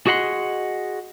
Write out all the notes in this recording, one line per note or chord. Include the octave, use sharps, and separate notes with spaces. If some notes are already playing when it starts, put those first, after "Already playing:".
F#4 G#4 D#5 F#5 B5 C6